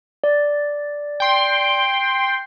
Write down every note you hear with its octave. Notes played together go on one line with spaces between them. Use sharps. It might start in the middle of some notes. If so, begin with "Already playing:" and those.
D5
G5 C6